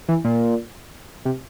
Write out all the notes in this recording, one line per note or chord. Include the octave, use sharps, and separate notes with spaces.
E3
A#2
C3